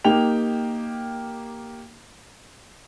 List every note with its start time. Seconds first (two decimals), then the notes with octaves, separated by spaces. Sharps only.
0.05 A#3 D#4 G4 G5 F7